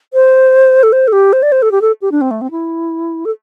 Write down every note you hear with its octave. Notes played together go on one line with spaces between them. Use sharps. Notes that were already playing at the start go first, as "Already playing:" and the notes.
C5
A4
C5
A4
G4
C5
D5
C5
A4
G4
A4
G4
D4
C4
A3
C4
E4
A4